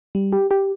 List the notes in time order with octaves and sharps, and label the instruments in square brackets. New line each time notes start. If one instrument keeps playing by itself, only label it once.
[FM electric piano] G3
G4
G4